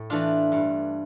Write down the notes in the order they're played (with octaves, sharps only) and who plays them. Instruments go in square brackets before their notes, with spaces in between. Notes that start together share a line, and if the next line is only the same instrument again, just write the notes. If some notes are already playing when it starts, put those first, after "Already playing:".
Already playing: [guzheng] A2
E3 A3 D4 F4
G2